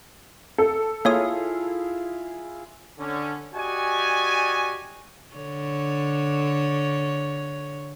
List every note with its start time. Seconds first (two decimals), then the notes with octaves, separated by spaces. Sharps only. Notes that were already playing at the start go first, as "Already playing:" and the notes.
0.58 A4
1.05 A#3 E4 F4 G#4 C#5 D#6
2.99 D3 C#4
3.55 F#4 G4 D5 D#5 G#5
5.35 D3 C#5